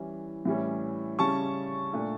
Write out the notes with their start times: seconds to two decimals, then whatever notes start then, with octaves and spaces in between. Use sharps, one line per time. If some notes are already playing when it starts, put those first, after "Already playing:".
Already playing: E3 G3 C#4
0.45 A2 E3 G3 C#4
1.19 C#3 G3 C#4 A5 C#6
1.93 A#2 A3 D4